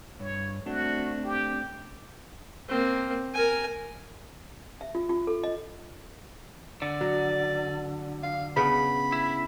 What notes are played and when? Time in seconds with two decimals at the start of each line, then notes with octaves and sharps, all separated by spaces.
0.20 G2 C#5
0.66 A3 C4 D4 F#4
1.24 G4
2.68 A#3 C4
3.34 A#4 G#5
4.81 E5
4.95 F4
5.09 F4
5.27 A4
5.44 D#5
6.82 D3 D5
7.01 F#3
8.23 F5
8.57 C#3 B3 D4 B5
9.12 E4